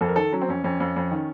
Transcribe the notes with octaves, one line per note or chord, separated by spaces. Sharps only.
F2 A4
A#4
D#3 A4
F#3 C#4
C4
F2 C#4
F2 C#4
F2
F2
D#3